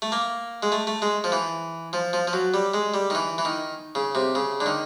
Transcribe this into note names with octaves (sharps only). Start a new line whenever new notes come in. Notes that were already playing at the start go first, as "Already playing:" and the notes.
A3
A#3
G#3
A3
A3
G#3
F3
E3
F3
F3
F3
F#3
G3
G#3
G3
D#3
E3
E3
D#3
C#3
C3
C#3
D3
D#3